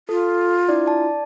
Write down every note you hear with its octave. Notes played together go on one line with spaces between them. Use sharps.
F4 A4
D4 E4 D5
D5 A5